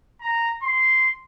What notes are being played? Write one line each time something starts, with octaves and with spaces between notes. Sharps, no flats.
A#5
C6